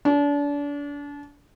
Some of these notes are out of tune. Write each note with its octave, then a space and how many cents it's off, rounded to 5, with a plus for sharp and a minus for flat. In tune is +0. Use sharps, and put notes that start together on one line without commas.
D4 -35